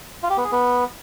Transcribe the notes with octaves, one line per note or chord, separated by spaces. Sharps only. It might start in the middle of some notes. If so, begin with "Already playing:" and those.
F4
G4
B3
G#4
B3